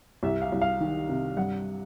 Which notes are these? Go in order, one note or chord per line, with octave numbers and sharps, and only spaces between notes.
C2 E5
F5
C2
F5
D#3
C3
G2 F#5